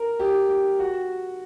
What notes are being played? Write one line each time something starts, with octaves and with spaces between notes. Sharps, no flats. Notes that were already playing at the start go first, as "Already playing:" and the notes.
Already playing: A#4
G4
G4
F#4